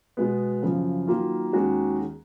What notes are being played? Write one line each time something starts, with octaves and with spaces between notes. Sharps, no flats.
B2 G#3 B3
F#2 C#3 F3
D#3 F#3 A#3 F4
D#2 D#3 G#3 C#4 F#4